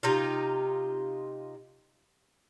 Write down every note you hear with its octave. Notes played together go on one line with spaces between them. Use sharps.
C3 D#4 F4